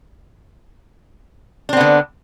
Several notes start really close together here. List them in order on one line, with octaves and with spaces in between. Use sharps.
D4 C4 B3 D3